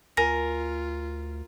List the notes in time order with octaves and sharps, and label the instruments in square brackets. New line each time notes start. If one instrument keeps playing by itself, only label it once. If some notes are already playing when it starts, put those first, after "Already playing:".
[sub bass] D2 [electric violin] F4 [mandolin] A#4 [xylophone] G#5 A#6